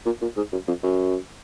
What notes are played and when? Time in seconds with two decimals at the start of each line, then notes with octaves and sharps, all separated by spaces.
0.05 A#2
0.21 A#2
0.36 G#2
0.52 F#2
0.67 F2
0.83 F#2